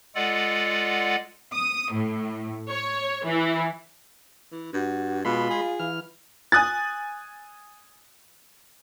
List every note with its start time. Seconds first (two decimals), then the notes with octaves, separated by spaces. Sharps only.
0.15 G#3 F4 A4 D5 F#5
1.54 D#6
1.92 A2
2.67 C#5
3.24 E3
4.52 E3
4.73 G2 F#4
5.25 B2 G#3 F4 F5 B5 C6
5.50 G#4
5.80 E3 F6
6.52 G#5 D#6 F#6 A6